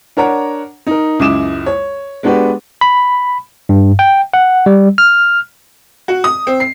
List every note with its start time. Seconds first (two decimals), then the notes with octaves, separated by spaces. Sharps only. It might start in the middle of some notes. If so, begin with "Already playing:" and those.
0.17 D4 A#4 C#5 F#5 A#5
0.87 D#4 A#4
1.19 C#2 F#2 E4 D6 D#6 E7
1.66 C#5
2.23 G#3 B3 D4 F#4 G4 B4
2.81 B5
3.69 G2
3.99 G5
4.34 F#5
4.66 G3
4.98 F6
6.08 F#4
6.24 D#6
6.47 C4
6.60 C7